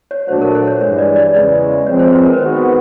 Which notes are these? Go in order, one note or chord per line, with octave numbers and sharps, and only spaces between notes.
C#5
A#2 F#3 A3 D4 F#4 C5
A#4
C5
C#5
G2 E3 G#3 C#5
D5
D5
E2 C#3 E3 G#3 C#4 D5
F3 G#3 C4 C#5
C5
B4
A#4
B4
D#3 G#3 B3 D#4 F#4 C5
A#4